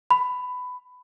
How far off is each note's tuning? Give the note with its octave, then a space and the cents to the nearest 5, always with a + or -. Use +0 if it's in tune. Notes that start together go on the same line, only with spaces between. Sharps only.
B5 +15